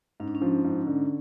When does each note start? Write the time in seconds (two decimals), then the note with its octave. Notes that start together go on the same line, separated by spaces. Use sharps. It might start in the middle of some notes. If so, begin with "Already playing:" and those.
0.20 G#2 C#4
0.28 D4
0.35 C#4
0.42 F3
0.65 G#2
0.87 D3